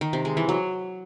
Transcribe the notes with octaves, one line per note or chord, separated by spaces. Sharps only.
D#3
C3
G#3
E3
F#3